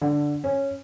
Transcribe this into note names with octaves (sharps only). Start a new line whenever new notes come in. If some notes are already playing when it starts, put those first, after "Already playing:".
D3
C#4